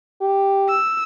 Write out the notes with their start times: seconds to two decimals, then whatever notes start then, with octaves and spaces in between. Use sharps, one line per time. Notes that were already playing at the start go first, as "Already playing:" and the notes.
0.21 G4
0.69 E6